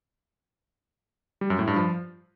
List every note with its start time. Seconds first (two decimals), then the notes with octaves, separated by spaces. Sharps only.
1.41 G3
1.50 F#2
1.59 A2
1.67 G2
1.76 F3